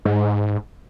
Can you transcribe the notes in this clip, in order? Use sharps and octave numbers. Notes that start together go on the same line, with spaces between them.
G#2